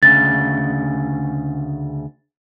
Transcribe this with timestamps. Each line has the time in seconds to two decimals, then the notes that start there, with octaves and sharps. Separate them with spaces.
0.03 D2 C#3 A6